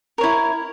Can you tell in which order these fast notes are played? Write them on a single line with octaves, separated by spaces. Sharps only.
A#4 C#5 E4